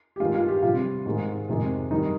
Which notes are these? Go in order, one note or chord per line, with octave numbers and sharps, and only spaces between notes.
G4
G2 D#3 G#3 F4
F4
G4
C3 G3 F4
G#2 D#3 G#3
F2 C3 D#3 G#3
G2 D#3 G3 D#4